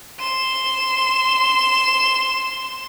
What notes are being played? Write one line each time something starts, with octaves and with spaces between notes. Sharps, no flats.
C6 E7